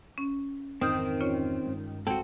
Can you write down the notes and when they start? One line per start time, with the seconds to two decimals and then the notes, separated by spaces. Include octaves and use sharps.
0.18 C#4
0.81 F2 G#2 D#3 E3 C4 D#6 F6 G6
1.21 C#4 F4 C#5
1.66 G2 G#3
2.07 G1 C2 G#3 C4 F#4 A4